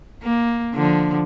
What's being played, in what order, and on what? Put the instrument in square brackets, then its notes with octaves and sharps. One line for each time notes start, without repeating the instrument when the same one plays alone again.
[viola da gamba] A#3
D3 F3